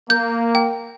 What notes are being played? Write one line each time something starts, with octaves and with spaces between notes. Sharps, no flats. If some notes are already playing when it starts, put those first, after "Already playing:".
A#3 G6
G5